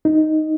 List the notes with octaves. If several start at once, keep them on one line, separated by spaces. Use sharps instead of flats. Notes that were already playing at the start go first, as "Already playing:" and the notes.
D#4